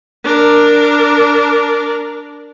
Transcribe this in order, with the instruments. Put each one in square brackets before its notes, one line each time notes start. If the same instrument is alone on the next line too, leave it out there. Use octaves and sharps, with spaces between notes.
[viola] D4 A#4